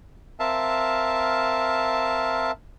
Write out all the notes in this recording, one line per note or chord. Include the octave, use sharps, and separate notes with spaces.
C4 A#4 E5 F5 A5